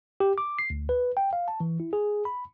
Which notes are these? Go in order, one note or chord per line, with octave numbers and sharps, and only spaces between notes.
G4
D6
C7
D2
B4
G5
F5
A5
E3
E4
G#4
B5